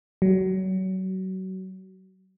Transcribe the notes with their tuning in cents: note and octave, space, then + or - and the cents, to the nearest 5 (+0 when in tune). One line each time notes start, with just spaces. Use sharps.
F#3 +30